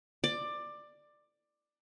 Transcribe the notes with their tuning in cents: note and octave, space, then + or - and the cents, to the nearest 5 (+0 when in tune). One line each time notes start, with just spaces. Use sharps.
D5 +15